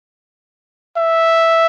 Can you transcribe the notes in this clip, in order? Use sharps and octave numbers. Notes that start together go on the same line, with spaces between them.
E5